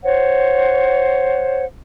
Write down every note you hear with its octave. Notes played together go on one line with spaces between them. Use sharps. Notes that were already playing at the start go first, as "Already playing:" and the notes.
C5 C#5 F#5